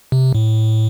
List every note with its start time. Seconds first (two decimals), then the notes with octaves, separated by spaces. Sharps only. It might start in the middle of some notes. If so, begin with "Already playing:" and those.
0.12 C3
0.35 A2